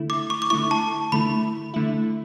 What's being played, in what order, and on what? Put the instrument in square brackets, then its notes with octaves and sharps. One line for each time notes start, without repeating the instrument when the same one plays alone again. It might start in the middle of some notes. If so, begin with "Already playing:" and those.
Already playing: [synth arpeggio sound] D3 A3 E4
[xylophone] D6
C#6
D6
[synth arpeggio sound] D3 A3 E4 [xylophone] C#6
[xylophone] A5
[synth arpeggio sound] D3 A3 E4 [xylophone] B5
[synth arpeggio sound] D3 A3 E4